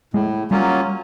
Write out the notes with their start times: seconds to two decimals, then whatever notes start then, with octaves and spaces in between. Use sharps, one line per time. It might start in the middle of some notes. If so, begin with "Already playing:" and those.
0.14 A2 G#3
0.51 F#3 G3 A#3 C#4 F4